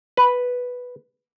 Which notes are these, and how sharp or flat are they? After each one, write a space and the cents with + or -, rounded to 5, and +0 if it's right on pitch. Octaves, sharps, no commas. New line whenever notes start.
B4 -5